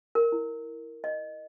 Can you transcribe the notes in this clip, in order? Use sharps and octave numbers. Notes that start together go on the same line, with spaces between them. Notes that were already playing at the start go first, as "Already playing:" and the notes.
A#4
E4
D#5